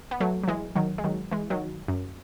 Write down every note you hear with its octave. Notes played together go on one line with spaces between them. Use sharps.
B3
F#3 A3
F#3
E3 G#3
D#3 F#3
G#3
D#3 F#3
E3 G#3
D#3 F#3
F#2